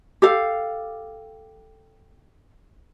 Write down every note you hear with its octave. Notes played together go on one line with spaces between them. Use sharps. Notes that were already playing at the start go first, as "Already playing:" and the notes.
G4 A4 F5